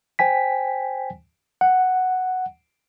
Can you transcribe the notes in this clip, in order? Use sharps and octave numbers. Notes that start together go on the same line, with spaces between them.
C5 G5 G#5 B6
F#5